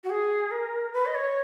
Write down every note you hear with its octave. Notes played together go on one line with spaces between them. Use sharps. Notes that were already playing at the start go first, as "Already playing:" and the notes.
F#4
G#4
A#4
B4
D#5
C#5